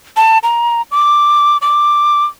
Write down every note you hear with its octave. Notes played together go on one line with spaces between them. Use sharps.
A5
A#5
D6
D6